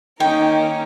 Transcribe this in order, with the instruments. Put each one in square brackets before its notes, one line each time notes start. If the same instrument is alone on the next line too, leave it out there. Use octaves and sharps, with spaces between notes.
[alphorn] D#3 [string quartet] A#3 C#4 A#4 [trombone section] D#4 [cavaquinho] G5